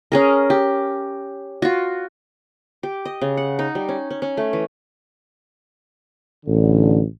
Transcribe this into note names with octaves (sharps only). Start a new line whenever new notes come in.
C#4 G#4 A#4
G4
F4 F#4
G4
D#5
C#3
F#5
D#4
G3
C#4
C#4
C#4
A3
E3
A1 D3